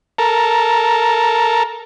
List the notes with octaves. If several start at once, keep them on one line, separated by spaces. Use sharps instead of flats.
A4 A#4